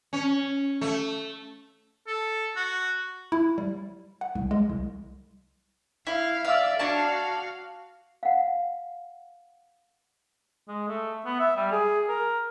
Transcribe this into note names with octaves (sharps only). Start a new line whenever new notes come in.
C#4
A3
A4
F#4
E4
G3
F#5
C2
G#3
C2
E4 F5
D5 E5 F5 E6
D4 F#4 C#5 F5 A5
F5 F#5
G#3
A3
B3
E5
G3
G#4
A#4